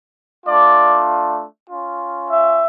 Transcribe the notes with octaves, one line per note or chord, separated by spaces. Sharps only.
A3 D4 F4 D5
C#4 F4
E5